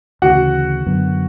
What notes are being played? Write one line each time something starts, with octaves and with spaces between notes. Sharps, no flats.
D2 C#3 E3 F#4 F#5
F#2 D3 F#3 B3